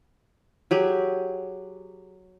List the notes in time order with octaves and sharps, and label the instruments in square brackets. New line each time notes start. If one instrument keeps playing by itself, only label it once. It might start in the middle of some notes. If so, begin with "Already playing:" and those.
[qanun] F#3 G4 G#4